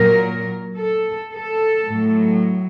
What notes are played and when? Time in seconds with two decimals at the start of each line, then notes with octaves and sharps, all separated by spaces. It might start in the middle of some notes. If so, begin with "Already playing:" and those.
Already playing: A#2 F#3 A#4
0.78 A4
1.33 A4
1.87 A2
1.92 F#3